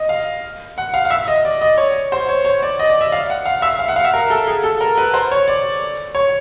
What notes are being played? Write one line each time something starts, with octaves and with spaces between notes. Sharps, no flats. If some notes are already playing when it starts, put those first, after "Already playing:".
Already playing: D#5
F5
F#5
F5
F5
E5
D#5
D5
D#5
C#5
C5
C#5
C#5
D5
D#5
D5
E5
F5
F#5
F5
E5
F5
F#5
F5
E5
A#4
A4
G#4
A4
A#4
B4
C5
C#5
D5
C#5